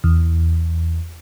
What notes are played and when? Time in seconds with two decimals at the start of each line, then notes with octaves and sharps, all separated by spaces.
0.04 E2